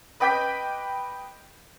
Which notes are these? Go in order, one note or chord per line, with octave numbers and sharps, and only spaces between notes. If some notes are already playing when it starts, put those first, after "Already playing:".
B4 D#5 G5 D6 G6 B6